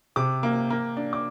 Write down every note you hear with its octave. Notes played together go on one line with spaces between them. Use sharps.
C3 D6
A#3
A#3
D4
D6